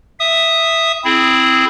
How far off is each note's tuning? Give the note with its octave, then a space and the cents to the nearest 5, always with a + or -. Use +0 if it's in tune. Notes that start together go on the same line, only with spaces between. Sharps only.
E5 +0 D#6 +0
C4 +0 E4 +0 G#4 +0